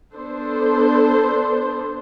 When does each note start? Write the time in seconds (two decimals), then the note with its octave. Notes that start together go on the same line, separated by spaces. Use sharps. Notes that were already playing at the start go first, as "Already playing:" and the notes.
0.14 B3 D4 A4 C5